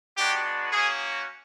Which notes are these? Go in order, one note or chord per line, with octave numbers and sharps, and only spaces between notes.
G#3 B3 D4 F#4 G4
A#3 C#4 F#4 G#4